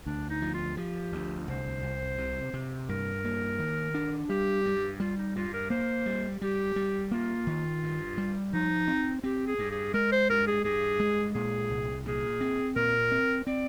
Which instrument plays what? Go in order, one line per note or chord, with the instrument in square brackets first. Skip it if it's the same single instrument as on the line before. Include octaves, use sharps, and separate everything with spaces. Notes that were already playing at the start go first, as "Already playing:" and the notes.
[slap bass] D2 [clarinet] D4
[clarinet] D#4
[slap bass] F3
[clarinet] F4
[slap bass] F3 [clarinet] G4
[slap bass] D2
[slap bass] C2 [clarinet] C5
[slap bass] C2
C3
C3
[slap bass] G2 [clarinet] A#4
[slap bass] A#3
D#3
D4
[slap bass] G3 [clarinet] G4
[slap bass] G2
[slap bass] G3 [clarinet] F4
[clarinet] D#4
[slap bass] G2 [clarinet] F4
[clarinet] A#4
[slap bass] A#3 [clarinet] C5
[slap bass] G3
[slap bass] G3 [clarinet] G4
[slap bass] G3
[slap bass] A#3 [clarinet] F4
[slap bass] D#3
G2
G3
[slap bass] F3 [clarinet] D#4
[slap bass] C4
[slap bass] C4 [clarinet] G4
[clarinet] G#4
[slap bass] G2
[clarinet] G#4
[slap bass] G#3 [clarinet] A#4
[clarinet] C5
[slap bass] G2 [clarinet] A#4
[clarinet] G#4
[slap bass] G2 [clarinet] G#4
[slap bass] G#3
[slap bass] A#2 [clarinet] G#4
[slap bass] C2
[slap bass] A#2 [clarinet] G#4
[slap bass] C4
[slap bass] A#2 [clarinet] A#4
[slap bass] C4
[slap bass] C4 [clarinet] D5